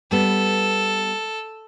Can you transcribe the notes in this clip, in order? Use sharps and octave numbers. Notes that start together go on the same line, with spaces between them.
G3 B3 A4